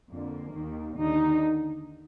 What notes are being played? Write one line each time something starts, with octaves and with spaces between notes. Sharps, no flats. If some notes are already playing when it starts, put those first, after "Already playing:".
F2 D3 A#3
D#2 D#3
D#2 D3 D#4